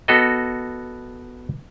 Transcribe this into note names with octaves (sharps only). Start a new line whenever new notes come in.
B3 F#4 A4 D#5